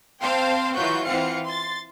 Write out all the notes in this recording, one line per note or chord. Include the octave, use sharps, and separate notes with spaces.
C4 C5 F5 G5 A5 C6
E3 F#3 F4 F#4 C#6 G6
E3 C4 F4 F5 F#5 C#7
C6 A6